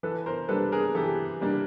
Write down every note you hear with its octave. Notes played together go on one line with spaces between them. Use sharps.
E3 A4 B4
A#4 C5
G3 A#3 D4 A4 B4
G#4 A#4
E3 G4 A4
G3 A#3 D4